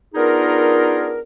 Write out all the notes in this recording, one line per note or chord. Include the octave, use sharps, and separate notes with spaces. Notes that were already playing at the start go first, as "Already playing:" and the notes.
B3 D4 D#4 F4 G#4 A#4